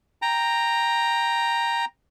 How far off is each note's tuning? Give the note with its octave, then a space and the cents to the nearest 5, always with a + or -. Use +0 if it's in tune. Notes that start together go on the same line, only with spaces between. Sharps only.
G5 +10 A#5 +0